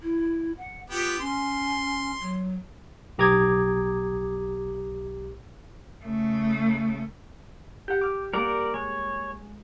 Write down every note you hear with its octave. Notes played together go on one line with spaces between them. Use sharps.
E4
F#5
B3 F4 G4 G5
C#4 C6
F#3
B1 G4 A#5 D6 D#6 G#6
C#3 A3
G4 F#5 G6
D6 F6
G3 A#3 A#4 D5 F#5
G#3 C#5